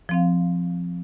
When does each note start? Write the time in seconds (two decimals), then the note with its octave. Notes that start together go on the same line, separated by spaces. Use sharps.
0.09 F3 C4 F5